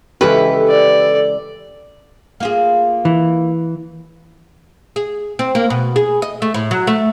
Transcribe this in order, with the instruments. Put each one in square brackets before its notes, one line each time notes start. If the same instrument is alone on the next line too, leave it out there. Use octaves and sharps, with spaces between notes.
[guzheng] C#3 E3 G#3 [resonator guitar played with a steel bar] G4 B4 [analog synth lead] A4
[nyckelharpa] D5
[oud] A#3 F4 G#4
[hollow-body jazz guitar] E3
[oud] G#4
C4
A#3
B2
G#4
D#5
A3
A2
F#3
A3